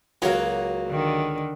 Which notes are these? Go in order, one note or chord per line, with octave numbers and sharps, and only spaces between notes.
C#2 F#3 A#3 F#4 C#5
D3 D#3